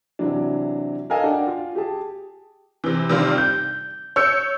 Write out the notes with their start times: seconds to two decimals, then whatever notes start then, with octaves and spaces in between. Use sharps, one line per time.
0.19 C3 E3 F#3 D4
1.09 A4 A#4 D#5 F5 G#5 A5
1.23 D4 F#5 G5
1.47 F4
1.75 G4 G#4 A5
2.84 C3 E3
3.09 C3 D#3 G3 D4 F4
3.38 G6
4.16 C#5 E6 G6 C#7